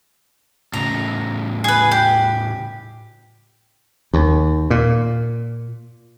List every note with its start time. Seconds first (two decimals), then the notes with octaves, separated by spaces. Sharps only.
0.73 A2 C#3 A#5
1.64 G#4 B4
1.91 G4
4.14 D#2
4.70 A#2